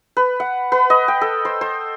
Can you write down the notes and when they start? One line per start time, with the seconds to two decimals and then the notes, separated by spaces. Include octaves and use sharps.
0.17 B4
0.40 F#5
0.72 B4
0.90 D#5
1.08 G5
1.21 A4
1.45 C5
1.61 C5